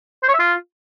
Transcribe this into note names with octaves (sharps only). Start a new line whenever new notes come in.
C5
C#5
E5
F4